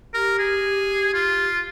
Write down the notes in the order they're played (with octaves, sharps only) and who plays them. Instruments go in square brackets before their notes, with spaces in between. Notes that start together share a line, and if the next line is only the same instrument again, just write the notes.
[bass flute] G4 [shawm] A#4
[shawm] G#4
F4